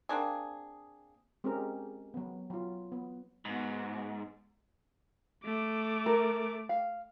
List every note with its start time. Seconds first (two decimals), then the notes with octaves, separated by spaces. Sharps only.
0.09 A#3 C4 D4 G#4
1.44 G#3 C4 C#4 G4 G#4 A#4
2.14 F#3 B3
2.50 F#3 F4
2.92 B3
3.45 G#2 B3 F#4
5.45 A3 D6
6.06 A#4
6.69 F5